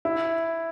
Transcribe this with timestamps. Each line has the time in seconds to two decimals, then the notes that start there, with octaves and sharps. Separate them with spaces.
0.05 E4